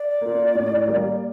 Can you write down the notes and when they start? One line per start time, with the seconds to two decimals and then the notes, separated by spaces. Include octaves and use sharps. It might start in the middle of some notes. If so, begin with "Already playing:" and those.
Already playing: D5
0.21 A#3 F4
0.55 A2
0.87 G3 A#3